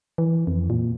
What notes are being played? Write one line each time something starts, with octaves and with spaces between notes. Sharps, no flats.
E3
F2
A#2